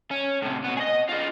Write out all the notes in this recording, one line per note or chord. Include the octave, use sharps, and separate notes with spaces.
C#4
A2 C3
B2 B3
G#4 D#5
F4 G#4